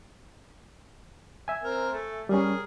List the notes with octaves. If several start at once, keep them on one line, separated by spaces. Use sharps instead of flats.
E5 G#5
C4 A#4
A3
G3 C#4 G#4 A#4